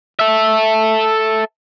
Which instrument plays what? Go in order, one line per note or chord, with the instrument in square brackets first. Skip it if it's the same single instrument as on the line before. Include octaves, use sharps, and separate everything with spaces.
[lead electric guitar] A4 E5